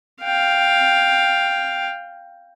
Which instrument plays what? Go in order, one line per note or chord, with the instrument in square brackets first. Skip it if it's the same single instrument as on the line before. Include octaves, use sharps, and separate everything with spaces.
[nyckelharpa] F5 G5